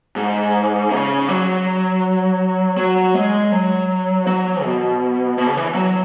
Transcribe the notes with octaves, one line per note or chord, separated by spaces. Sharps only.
G#2
C#3
F#3
F#3
G#3
F#3
F#3
B2
B2
C#3
E3
F#3